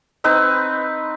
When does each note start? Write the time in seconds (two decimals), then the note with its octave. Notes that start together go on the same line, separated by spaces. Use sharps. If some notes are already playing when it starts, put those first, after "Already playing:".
0.24 C4 D#4 B4